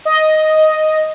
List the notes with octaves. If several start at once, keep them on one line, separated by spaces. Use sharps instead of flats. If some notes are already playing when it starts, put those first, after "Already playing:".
D#5